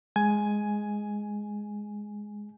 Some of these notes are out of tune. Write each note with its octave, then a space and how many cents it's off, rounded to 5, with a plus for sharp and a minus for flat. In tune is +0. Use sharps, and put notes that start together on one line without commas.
G#3 +0 G#5 +10